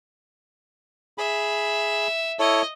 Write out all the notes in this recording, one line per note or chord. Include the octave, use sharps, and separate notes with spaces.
G#4 E5 B5
E4 A4 C#5 D#5